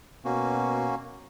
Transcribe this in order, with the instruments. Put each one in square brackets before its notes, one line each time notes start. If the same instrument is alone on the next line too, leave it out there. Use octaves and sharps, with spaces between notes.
[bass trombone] B2 [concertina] A#3 C#4 F#4